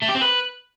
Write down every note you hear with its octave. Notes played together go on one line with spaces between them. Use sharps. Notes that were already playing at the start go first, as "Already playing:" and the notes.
A3
G4
C4
B4